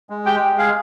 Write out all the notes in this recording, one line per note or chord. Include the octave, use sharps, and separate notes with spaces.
G#3
G4 G5
G#3
G#4 F5